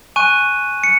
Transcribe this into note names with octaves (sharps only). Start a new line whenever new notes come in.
G#5 C#6 F#6 D#7
C#7